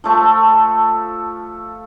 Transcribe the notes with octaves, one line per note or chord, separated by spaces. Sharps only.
F3 A3 A4